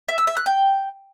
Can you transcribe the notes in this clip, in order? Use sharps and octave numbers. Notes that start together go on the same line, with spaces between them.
E5
E6
E5
F#6
G5